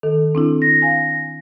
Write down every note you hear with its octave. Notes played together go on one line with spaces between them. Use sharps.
D#3 A4
C4 D4 E4
A#6
F5 G#5